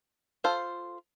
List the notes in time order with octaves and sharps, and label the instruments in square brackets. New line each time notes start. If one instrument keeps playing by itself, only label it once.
[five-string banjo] F4 A4 C5 F5